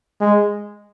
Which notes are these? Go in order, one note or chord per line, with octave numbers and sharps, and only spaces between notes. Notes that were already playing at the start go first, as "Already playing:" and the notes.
G#3